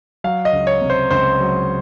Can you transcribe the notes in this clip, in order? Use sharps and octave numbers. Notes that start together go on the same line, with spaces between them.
F#3 F5
D#5
C#2
C#5
C3
C5
C#2 C5
F#3